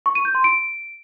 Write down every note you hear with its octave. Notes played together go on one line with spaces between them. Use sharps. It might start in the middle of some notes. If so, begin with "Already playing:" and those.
C#6
D#7
G6
C6
D7